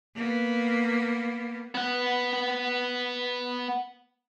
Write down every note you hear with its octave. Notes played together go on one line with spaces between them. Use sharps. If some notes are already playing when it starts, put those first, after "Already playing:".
A#3 B3
B3 F#5